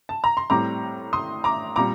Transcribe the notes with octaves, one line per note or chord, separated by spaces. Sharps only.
A5
A#5
C6
A2 G3 C4 A#5 D6
C6 D#6
A#5 D6
A#2 G3 C4 A#5 D6